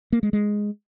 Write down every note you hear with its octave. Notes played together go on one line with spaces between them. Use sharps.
A#3
G#3
G#3